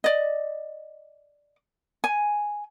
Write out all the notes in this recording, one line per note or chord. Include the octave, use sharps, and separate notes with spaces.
D5 D#5
G#5